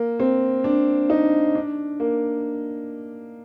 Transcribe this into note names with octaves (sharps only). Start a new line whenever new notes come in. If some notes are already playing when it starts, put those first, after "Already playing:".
Already playing: A#3
C4
D4
D#4
D4
A#3